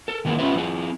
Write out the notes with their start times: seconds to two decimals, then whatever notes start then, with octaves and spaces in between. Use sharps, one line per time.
0.08 A4 A#4
0.25 D#3 E3 A#3 D#4 E4 G#4
0.39 C#4 F4 G4 B4 C5 E5
0.55 F3 C4 E4 G#4